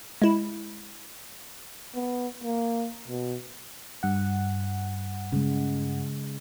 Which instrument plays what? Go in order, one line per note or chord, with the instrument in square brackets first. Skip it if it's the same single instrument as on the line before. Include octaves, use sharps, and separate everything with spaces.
[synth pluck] G#3 E4
[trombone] B3
A#3
B2
[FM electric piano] G2 F#5
[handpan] C#3 G#3